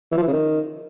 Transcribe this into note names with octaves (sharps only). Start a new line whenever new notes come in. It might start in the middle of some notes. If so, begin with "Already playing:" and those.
E3
F3
E3
C#3
D#3